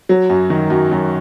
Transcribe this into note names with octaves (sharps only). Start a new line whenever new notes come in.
F#3
F#2
D#3
F#2
F#2